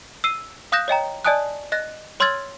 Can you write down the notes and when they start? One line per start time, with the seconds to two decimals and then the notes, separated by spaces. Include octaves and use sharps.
0.24 E6 C7 D#7
0.72 F5 D#6 F#6 G6 A#6 E7
0.88 C#5 D#5 G5 A#5
1.25 D5 D#5 G#5 A5 D#6 F#6
1.72 D#5 F#6 A#6
2.20 C#5 C6 E6 F6 G#6 A6